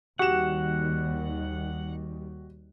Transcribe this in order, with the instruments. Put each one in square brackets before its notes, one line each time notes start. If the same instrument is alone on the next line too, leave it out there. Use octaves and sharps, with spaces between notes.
[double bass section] D#2 D#3 G3 [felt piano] F#4 G4 E7 [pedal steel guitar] F#5